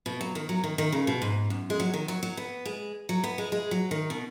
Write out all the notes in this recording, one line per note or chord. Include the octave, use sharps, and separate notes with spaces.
B2
F#3
D#3
F#3
D#3
D#3
C#3
B2
G#2
F#2
G#3
F#3
D#3
F#3
F#3
B3
G#3
F#3
B3
G#3
G#3
F#3
D#3
B2